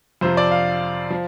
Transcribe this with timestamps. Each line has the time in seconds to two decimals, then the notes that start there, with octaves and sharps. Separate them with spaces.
0.21 F2 C3 F3 C5
0.37 D5
0.51 F5
1.10 F3